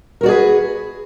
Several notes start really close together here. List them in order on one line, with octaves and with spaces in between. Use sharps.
A#4 F#4 D5 G#4 B4